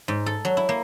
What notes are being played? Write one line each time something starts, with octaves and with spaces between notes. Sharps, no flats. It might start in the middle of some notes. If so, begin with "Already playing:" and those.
G#2
A4
F#3
E4
A#3